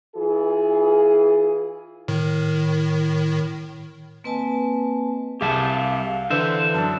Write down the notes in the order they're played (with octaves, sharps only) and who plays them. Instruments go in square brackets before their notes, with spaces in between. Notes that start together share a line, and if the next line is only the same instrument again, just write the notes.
[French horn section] E3 F4 G#4
[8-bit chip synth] A2 D#3
[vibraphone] A#3 C4 B4 D#5 G#5 A5
[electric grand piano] C2 G#4 [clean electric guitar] G4 E5 A5 [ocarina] F5
[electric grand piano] D3 [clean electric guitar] E3 C5 E5 [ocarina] B4
[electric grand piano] F#2 D4 [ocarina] A5